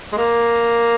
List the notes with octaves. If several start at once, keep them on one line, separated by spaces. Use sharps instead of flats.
G#3
A#3